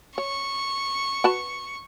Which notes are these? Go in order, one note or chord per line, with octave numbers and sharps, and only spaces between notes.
C#5 C#6
F#4 B4 A5